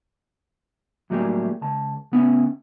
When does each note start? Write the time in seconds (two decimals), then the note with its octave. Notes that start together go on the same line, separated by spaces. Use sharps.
1.10 A2 F#3 G3 A#3 G4 G#4
1.61 C#2 A5
2.12 C#3 B3 C#4